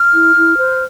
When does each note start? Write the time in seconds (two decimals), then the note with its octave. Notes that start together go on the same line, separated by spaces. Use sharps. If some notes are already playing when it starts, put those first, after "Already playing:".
Already playing: F6
0.13 E4
0.36 E4
0.57 C5